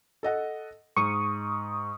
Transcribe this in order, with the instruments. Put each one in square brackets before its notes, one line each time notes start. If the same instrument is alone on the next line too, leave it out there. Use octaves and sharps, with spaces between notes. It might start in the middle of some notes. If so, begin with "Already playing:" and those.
[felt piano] A4 D#5 F#5
[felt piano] G#2 [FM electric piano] C#6 D#6